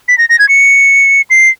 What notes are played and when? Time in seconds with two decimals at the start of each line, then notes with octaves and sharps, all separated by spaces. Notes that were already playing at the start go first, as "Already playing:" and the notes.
0.08 B6
0.18 A#6
0.29 A#6
0.39 G#6
0.49 C#7
1.30 C7